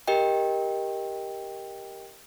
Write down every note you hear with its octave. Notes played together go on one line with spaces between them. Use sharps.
G4 A#4 D#5 G5